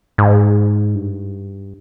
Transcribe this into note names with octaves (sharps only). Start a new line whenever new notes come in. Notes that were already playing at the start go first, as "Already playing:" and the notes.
G#2
G2